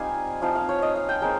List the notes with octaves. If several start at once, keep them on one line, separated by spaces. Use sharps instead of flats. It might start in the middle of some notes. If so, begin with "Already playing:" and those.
Already playing: G3 C4 D#4 F4 F5 G#5 D#6
F3 C4 D#4 F5
F5
C#5
D#5
F5
G5
G#3 C4 A#4